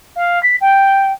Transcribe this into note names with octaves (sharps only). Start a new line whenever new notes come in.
F5
B6
G5